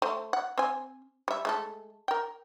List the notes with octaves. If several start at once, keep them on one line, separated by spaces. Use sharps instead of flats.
A3 C5
F#5
C4 G#5
G3 E5
G#3 A3 A4
A#4 G5